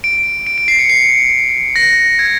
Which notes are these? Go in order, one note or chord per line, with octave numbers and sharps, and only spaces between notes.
D7
D7
D7
C7
C#7
C7
A#6
G#6